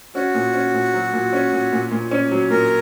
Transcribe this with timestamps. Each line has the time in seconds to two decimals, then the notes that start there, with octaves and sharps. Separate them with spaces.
0.15 C#4 F#4
0.34 A#2
0.54 C#4
0.74 A#2
0.94 F#3
1.13 A#2
1.33 C#4
1.53 A#2
1.72 A#2
1.91 A#2
2.11 C#4
2.31 F#3
2.50 A#2 A#4